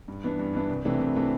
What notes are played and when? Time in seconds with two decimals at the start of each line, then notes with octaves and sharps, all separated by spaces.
0.08 G2
0.24 E3 B3 D4
0.39 G2
0.54 E3 B3 D4
0.69 C2
0.85 C3 E3 A3 D4
0.99 C2
1.15 C3 E3 A3 D4